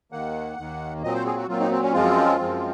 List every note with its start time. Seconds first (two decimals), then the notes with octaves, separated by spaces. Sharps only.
0.12 D#2 D#3 A#3 F#5
0.57 D#2 D#3 A#3
1.02 A#2 F#3 C4 D#5
1.14 C5
1.26 G#4
1.37 F#4
1.48 A#2 F#3 C4 F4
1.60 D#4
1.71 C4
1.82 C#4
1.93 F#2 F3 G#3 C4 F4
2.38 F#2 F3 G#3 C4